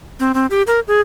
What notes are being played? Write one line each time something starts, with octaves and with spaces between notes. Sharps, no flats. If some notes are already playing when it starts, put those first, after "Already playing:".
C4
C4
G4
A#4
G#4